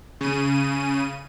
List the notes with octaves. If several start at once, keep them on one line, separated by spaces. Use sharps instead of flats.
C#3 D#7